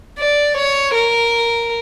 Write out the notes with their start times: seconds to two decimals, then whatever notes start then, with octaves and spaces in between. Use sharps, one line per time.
0.19 D5
0.57 C#5
0.94 A#4